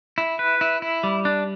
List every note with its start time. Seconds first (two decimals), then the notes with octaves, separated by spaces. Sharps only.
0.18 E4
0.39 B4
0.61 E4
0.82 E4
1.03 G3
1.25 D4